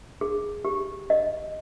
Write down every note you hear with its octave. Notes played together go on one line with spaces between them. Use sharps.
G#4
G4
D#5